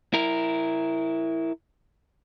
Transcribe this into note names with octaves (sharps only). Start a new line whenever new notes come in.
E4 A#4